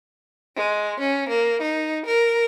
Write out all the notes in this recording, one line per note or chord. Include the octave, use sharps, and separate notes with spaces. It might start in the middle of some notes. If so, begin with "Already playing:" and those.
G#3
C#4
A#3
D#4
A#4